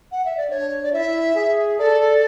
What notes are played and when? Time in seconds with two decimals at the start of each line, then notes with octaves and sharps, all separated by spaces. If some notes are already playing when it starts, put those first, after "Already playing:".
0.12 F#5
0.25 E5
0.37 D5
0.49 D4 C#5
0.83 D5
0.93 E4 E5
1.35 G#4
1.79 A4 D5